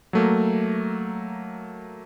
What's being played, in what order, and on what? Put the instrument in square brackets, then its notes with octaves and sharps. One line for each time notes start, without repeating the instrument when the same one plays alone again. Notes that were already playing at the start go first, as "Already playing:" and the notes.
[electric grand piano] F#3 A3 A#3